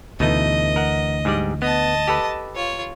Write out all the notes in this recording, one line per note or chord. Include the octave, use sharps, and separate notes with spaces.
D2 B2 E3 A3 D#4 D#5
A#4 F#5
G#2 G3 D5
B3 D#5 A5
G4 A4 B4
F4 C#5